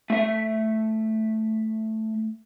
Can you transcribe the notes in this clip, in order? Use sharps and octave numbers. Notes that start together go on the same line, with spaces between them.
A3 E5